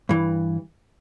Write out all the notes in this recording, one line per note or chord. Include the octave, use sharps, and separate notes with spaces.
G2 E3